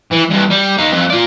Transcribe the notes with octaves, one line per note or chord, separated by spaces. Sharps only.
E3
G2 E3
G3
D#4 F5
F2
F4 D5